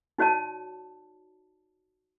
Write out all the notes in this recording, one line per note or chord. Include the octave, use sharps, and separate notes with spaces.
D#4 F#4 C#5 D5 A5